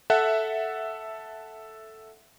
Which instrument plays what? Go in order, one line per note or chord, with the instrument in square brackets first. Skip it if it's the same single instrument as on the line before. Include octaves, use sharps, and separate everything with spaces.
[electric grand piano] A4 E5 F#5 F#6